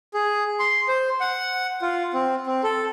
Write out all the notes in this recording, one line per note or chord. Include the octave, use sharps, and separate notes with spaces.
G#4
C6
C5
F#5
F4
C4
C4
A4